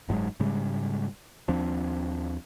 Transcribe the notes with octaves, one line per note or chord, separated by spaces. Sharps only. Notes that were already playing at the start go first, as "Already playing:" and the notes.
F#1 G#2 F#3 G#3
G#2 C#3 G3 G#3
D#2 F3 C4 D4